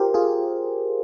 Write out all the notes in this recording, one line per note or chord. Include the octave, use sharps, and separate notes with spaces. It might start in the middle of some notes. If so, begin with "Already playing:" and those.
Already playing: F4 G4 A#4 C5
F4 G#4